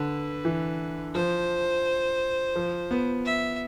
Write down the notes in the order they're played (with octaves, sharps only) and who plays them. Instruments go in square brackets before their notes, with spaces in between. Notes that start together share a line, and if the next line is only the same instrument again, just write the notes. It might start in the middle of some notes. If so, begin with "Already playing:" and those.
Already playing: [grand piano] D3 [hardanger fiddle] B4
[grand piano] E3
[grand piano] F3 [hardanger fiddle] C5
[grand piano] F3
B3
[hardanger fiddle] E5